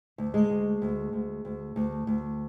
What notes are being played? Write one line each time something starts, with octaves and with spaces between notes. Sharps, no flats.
D2
G#3
D2
D2
D2
D2
D2
D2